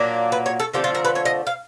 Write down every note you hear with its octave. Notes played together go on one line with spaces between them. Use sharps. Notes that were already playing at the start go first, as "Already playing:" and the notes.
Already playing: A#2 F#3 A#3 D4
B4
C#5
A4
D3 F3 A3 C4 G4
F4
A#4
B4
C#5
D#5
F5